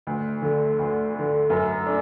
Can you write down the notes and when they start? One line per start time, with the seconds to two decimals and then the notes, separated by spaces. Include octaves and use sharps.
0.07 D2
0.42 D3 A3
0.79 D2
1.14 D3 A3
1.50 F#2
1.86 A3 D4